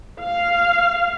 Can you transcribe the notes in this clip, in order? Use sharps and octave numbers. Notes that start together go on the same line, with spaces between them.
F5